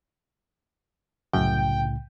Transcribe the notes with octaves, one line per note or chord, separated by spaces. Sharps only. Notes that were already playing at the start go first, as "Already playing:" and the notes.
C2 F#2 A2 C#3 G5